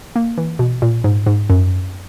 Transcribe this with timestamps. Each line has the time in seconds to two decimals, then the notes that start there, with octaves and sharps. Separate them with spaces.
0.16 A#3
0.38 E3
0.59 B2
0.82 A#2
1.04 G#2
1.26 G#2
1.50 F#2